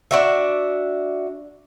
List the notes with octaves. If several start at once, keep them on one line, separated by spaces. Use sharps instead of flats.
D4 F#4 E5